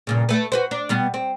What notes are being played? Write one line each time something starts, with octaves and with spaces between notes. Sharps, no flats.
G2 A#2 C#3
A3 B4
F#4 B4 C5
D4
B2 G3 B3
C4